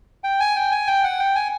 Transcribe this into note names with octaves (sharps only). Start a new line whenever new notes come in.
G5
G#5
G5
G#5
G5
F#5
G5
G#5